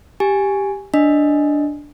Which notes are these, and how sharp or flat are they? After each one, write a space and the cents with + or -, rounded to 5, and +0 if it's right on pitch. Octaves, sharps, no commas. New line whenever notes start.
G4 +0 G#5 +0
D4 +0 D#5 +0